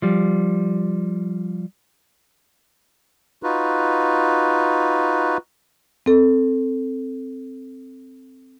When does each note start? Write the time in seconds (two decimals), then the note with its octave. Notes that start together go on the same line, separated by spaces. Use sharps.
0.02 F3 G3
3.43 D#4 F4 F#4 B4
6.06 C4 A4